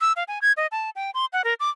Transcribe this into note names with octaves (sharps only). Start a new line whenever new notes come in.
E6
F5
G#5
G#6
D#5
A5
G5
C6
F#5
A#4
D6